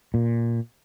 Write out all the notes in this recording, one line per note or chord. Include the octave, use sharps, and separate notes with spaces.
A#2